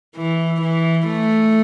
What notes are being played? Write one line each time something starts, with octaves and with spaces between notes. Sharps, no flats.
E3
E3
A3